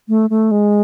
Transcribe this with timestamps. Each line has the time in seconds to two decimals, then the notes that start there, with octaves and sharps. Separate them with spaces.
0.09 A3
0.30 A3
0.51 G#3